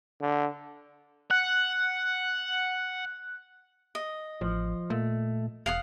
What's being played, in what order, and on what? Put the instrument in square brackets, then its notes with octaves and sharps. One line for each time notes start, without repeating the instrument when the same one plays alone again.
[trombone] D3
[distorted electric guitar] F#5 [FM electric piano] F#6
[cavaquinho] D#5
[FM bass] A1 [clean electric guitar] F3
[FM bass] A#2 [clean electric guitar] A3
[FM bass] E1 [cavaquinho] F5 F#5 D#6